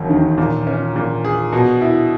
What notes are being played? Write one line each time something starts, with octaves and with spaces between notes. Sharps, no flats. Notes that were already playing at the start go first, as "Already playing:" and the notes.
Already playing: E1 D#2
D#3
A#2
C#4
A#2
G#4
B2
E4